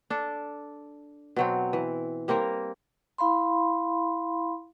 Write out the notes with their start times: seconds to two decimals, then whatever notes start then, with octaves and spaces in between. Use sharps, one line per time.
0.10 D4 A4
1.36 B2 F#3 C4
1.73 E3
2.28 G3 A#3 C4 A#4
3.18 E4 F5 B5 C6